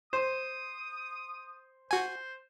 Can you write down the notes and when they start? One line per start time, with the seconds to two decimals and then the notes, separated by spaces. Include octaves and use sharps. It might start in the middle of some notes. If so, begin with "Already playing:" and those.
0.13 C5 D#6
1.91 F#4 C5 G#5